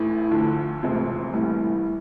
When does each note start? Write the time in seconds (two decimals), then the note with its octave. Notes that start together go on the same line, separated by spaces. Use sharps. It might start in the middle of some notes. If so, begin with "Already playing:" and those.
Already playing: A1 A2 E3
0.31 D2 D3 F3
0.83 E1 D2 C3 F3 C4
1.33 A#1 A2 E3 G3